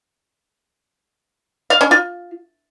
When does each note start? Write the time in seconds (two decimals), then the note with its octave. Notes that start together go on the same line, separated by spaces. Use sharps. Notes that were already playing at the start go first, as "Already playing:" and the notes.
1.70 F5
1.81 C#4
1.91 F4